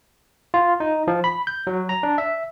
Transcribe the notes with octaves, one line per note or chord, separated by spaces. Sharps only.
F4
D#4
F3
B5
G6
F#3
A#5
D4
E5